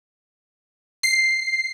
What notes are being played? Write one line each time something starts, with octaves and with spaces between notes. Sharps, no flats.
C7